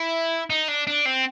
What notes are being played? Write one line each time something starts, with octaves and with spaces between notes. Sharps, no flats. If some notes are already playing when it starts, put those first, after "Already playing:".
Already playing: E4
D#4
D4
D4
C4